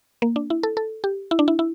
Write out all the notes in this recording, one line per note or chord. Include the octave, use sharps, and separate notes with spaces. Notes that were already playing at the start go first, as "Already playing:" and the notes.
A#3
D4
E4
A4
A4
G4
E4
D4
E4
E4